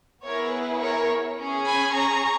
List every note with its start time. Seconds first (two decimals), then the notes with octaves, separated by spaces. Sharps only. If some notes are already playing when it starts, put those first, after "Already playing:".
0.24 B3 E4 G#4 A#4 C#5
0.53 B4
0.81 A#4 C#5
1.38 C#4 G#4
1.66 G#5 B5
1.94 A#5 C#6